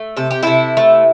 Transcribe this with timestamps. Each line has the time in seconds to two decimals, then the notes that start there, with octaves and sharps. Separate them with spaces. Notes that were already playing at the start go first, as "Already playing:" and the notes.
Already playing: A3
0.17 C3 A4
0.31 G4
0.43 C3 E4 A4
0.77 A3